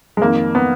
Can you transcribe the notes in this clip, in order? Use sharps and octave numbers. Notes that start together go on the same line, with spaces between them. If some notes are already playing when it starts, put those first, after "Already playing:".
G#3
F2 D#3 A#3
B3